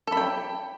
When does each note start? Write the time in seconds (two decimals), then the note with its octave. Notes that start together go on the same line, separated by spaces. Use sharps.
0.07 A4
0.12 B5
0.17 G5